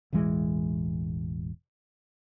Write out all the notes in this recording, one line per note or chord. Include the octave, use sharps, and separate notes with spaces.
E1 A1 E3 G#3